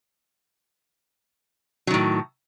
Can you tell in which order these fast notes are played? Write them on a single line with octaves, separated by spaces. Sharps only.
F#3 D#3 A2